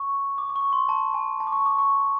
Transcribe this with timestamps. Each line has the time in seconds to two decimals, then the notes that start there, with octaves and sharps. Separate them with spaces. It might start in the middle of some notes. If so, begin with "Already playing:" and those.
Already playing: C#6
0.38 D6
0.50 D6
0.56 C#6
0.73 C6
0.89 A5
1.14 G#5
1.40 A5
1.47 D6
1.52 C#6
1.66 D6
1.79 C#6